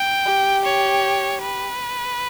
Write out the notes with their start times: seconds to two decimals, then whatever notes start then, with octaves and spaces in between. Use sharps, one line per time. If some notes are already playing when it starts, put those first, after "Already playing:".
Already playing: G5
0.26 G4
0.64 C#5
1.42 B4